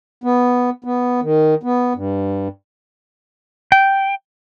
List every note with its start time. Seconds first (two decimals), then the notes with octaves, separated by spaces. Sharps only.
0.24 B3
0.84 B3
1.22 D#3
1.63 B3
1.95 G2
3.72 G5